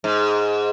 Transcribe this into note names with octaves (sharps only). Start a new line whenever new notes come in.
G#2